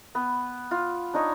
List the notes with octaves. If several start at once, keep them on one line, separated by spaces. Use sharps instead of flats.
B3
F4
D4 D#4 C#5 D#5